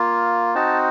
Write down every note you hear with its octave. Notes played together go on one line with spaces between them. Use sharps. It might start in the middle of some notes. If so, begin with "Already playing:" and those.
Already playing: A#3 F4
C4 D#4 F#4 A5